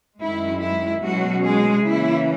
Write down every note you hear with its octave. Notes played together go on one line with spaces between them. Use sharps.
F#2 D#3 G#3 E4
E4
B2 F#3 G#3 C#4 F#4
G#3 G#4
C#3 E3 A#3 C#4 E4